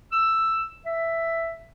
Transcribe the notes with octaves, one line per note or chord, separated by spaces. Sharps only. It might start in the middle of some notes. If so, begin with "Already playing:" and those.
E6
E5